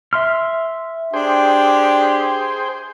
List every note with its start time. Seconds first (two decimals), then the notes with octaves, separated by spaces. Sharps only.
0.13 E5 C6 F6
1.13 D4 G4 G#4 C5 G5